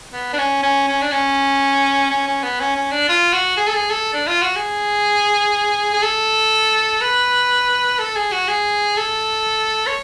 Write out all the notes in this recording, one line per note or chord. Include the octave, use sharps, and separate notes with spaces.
B3
D4
C#4
C#4
C#4
D4
C#4
C#4
C#4
B3
C#4
C#4
D4
F4
F#4
G#4
A4
G#4
A4
D4
F4
F#4
G#4
G#4
A4
B4
A4
G#4
F#4
G#4
A4
C#5